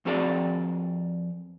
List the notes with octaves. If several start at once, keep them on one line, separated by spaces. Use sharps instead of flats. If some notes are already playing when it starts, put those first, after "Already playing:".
F2 C4 F#4 G#4 A#4 D5